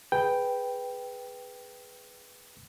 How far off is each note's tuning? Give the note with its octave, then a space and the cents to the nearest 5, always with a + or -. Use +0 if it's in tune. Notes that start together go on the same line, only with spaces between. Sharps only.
G#4 +0 B4 +0 G5 +0